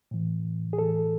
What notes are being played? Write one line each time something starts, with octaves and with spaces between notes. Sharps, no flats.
A2 E3
G#4
A2 E3 A4